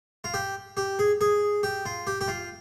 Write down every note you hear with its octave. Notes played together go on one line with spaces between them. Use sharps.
F4
G4
G4
G#4
G#4
G4
F4
G4
G4
F4